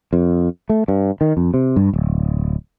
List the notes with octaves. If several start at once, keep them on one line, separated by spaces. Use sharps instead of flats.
F2
A3
G2
D#3
F2
C3
G2
D1